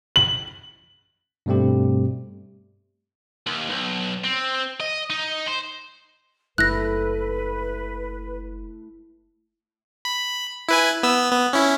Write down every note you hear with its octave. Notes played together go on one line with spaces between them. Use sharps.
F#7
G2 B2 G3 A3 C4 G4
D#2
B1
C4
D#5
D#4
C5
F#1 A3 E4 B4 F#6 A#6
B5
E4 B4 G#5
B3 E6
B3
C#4 E4